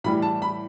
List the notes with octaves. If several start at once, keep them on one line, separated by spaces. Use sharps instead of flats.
A2 E3 G3 B5
A5
B5